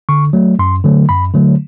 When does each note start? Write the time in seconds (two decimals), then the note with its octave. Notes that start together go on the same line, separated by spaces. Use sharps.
0.09 D3 C#6
0.33 F#3 A3
0.59 F#2 C6
0.84 D3 F#3 A3
1.09 F#2 B5
1.34 D3 F#3 A3